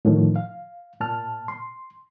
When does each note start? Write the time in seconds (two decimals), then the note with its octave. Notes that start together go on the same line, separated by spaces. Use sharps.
0.05 A2 D3 D#3 F3
0.36 F5
1.00 A#2 A5 F6
1.48 C6